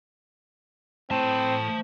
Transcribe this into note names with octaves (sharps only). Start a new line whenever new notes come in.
A2 C4 C5 A5